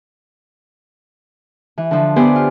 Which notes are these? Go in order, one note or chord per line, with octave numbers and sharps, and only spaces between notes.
E3
D3 F3
B3 G4 B4 C5 D5 G#5
F4